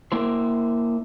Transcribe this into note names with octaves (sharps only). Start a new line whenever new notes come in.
A#3 E4 C5